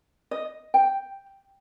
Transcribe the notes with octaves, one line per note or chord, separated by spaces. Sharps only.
D#5
G5